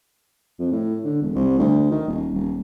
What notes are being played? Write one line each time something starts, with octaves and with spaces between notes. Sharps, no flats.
F2
A2
D3
E1
C2
D2
D#3
D#1
D#1